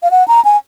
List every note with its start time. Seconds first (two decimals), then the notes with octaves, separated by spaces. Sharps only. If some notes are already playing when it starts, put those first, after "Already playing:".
0.03 F5
0.11 F#5
0.28 A#5
0.45 G#5